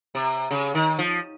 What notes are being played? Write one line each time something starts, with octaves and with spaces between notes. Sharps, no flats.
C3
C#3
D#3
F3